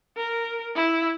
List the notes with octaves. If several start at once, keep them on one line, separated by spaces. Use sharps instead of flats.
A#4
E4